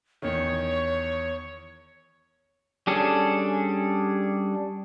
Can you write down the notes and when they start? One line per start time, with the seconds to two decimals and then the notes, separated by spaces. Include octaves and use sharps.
0.22 E2 D#3 C#5
2.87 G3 C#4 D4 G#4 A4